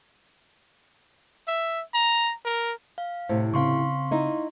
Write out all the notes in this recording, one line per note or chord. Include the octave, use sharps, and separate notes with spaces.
E5
A#5
A#4
F5
A2 C3 C5
C#3 C4 F5 C6 C#6
D#4 E4